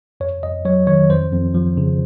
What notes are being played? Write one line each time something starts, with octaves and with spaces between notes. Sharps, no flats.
F2 C#5
F2 D#5
F#3 C#5
D#3 C#5
F2 C5
F2
F3
C#3